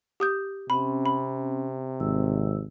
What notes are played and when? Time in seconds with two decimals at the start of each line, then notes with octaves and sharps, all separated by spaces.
0.20 G4 D#6 G6
0.70 C3 C4 C#4 B5
1.06 B5
2.00 G#1 E6